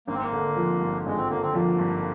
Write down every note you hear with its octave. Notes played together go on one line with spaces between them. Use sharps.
G#1 A#3
C4
A#3
D3
F3
G2
G#1 G#3
C4
D3 A#3
C4
F3 A#3
G2